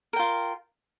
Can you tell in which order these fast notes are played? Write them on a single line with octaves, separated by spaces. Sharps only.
A#4 G5 F4